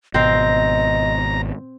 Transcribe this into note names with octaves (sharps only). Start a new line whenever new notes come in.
G#1 B2 C4 D#5 F5 A#5